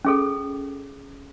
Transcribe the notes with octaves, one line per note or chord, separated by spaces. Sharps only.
C#4 G#4 A4